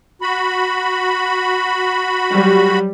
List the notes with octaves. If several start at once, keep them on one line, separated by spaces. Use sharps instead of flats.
F#4 B5
F#3 G3